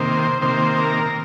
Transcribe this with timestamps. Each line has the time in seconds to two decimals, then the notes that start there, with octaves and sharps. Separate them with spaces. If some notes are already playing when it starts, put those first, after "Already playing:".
Already playing: C3 D#3 A#3 C5
0.41 C3 D#3 A#3 C5
0.78 A#4